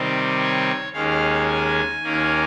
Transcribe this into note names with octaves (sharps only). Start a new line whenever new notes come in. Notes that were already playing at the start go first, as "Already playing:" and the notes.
Already playing: C3 D#3 G3 C4 D#4
C#5
D#2 D#3 G#3 C#4 F5
G#5
D#2 D#3 A#3 C#4